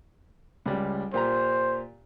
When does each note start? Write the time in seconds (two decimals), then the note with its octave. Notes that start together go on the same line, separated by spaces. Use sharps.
0.66 C#2 G3
1.14 A#2 G4 C5 A#5